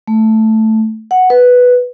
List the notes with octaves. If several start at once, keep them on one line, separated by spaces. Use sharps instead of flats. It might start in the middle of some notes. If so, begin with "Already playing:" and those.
A3
F#5
B4